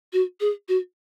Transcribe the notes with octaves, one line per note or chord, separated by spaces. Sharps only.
F#4
G#4
F#4